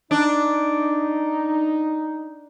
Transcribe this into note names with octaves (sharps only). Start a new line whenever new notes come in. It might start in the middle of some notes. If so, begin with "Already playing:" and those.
D4 D#4